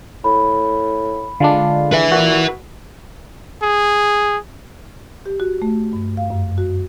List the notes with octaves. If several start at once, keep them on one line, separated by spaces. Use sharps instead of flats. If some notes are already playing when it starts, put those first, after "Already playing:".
A2 B5
D3 G#3 D4 F4
B4 E5
A#2 F#4
G#4
G4
F#4
A3
G2
F5
F#2
F#4